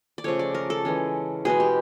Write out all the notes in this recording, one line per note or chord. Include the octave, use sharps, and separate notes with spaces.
D5
C#3 F3 A3 C#5
D5
A#4
A4
E3 G#3 C#4
B2 G#3 B3 G#4
G4